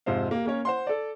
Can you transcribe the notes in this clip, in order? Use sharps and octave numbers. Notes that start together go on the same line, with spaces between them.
F2 G#2 C3 C5 F5
A#3 G4
A#3 C#4 C#5
C5 F#5 C6
A4 D5